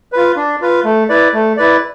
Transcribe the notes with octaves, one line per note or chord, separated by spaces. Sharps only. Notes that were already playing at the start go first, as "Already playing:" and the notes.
F4 B4
D4
F4 B4
A3
E4 B4 D5
A3
E4 B4 D5